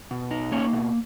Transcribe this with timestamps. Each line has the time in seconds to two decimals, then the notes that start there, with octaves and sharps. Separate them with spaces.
0.11 B2
0.31 D#4
0.52 A#3 C#4 C#5
0.73 B2